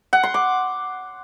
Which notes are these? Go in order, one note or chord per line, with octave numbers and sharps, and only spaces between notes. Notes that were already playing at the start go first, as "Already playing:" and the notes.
F#5
C6
D6